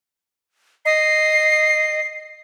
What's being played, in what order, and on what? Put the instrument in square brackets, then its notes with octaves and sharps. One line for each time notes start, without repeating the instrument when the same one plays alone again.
[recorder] D#5 [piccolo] C7